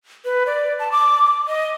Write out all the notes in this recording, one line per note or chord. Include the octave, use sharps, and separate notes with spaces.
B4
D5
A5
D6
D#5